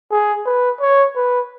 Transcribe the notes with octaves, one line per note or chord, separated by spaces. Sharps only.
G#4
B4
C#5
B4